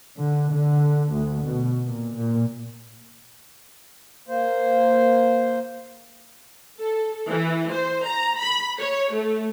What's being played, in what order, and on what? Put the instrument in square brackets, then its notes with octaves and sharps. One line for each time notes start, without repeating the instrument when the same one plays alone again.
[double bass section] D3
D3
D2
B2
A#2
A#2
[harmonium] A#3 C5
[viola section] A4
E3
C5
A#5
B5
C#5
A3